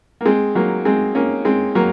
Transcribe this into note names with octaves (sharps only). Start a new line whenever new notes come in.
A#3
G#3 C4
F#3 A#3
G#3 C4
A#3 C#4
G#3 C4
F#3 A#3